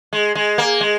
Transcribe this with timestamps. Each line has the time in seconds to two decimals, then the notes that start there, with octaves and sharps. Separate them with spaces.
0.13 G#3
0.35 G#3
0.58 A#3
0.81 G#3